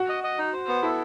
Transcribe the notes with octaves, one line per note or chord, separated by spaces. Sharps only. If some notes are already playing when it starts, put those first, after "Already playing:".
Already playing: F#4
D#5
D#5
D#4
C5
B3
E4 A4